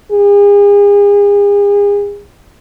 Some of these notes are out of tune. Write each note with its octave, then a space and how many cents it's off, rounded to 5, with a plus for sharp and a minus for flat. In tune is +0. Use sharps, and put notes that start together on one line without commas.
G#4 -40